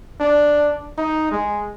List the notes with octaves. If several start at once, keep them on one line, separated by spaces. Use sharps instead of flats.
D4
D#4
G#3